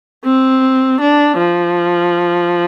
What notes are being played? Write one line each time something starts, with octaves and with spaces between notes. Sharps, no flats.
C4
D4
F3